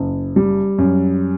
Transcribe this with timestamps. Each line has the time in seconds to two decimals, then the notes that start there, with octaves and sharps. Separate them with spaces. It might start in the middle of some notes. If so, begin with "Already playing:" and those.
Already playing: F#1
0.36 G3
0.78 F#2